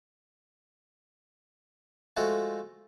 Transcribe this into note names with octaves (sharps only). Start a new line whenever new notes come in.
F3 G#3 A3 F4 F#4